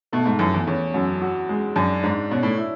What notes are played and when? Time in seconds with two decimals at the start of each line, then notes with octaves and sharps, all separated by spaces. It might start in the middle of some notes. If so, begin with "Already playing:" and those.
0.13 B2 A3
0.25 G#2
0.39 F#2 E3
0.54 E2
0.67 E2 C#4
0.94 F#2
1.21 F#4
1.49 G#3
1.76 F#2 D4
2.03 G#2 D4
2.30 B2 C#4
2.43 A2
2.58 E4